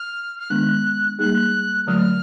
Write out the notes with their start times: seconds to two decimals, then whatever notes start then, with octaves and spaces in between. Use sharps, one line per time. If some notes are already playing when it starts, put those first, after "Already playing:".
Already playing: F6
0.39 F6
0.50 D#3 G#3 B3 D4 F#6
1.19 G3 A#3 D#4 G#4 F#6
1.87 D3 F#3 A3 F6